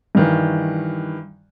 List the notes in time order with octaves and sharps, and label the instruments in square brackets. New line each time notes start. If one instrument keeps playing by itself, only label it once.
[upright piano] G2 D#3 E3